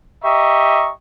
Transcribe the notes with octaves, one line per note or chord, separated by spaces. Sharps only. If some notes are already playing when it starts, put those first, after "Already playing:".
G4 D#5 E5 A#5 C#6